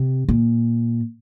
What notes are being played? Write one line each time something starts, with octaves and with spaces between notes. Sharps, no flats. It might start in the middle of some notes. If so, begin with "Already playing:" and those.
Already playing: C3
A#2